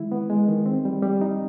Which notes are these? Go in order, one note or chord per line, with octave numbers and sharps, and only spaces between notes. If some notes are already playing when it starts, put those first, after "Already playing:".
Already playing: D#3 G#3 E4
B3
G#3
D#3
C4
G3
G3
D#4